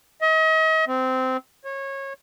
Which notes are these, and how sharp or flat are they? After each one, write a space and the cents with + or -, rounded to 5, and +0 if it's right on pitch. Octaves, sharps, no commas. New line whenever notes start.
D#5 +40
C4 -15
C#5 -25